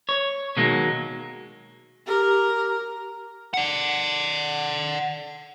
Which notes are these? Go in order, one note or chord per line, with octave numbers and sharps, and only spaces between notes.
C#5
B2 D#3 F#3 G#3 A#3
G4 A#4
D5 F#5